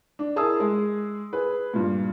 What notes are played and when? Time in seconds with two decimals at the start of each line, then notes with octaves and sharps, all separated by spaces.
0.19 D4
0.36 E4 G#4 A#4 A5 D#6 E6
0.60 G#3 G#4
1.33 G#4 B4
1.73 G2 A#2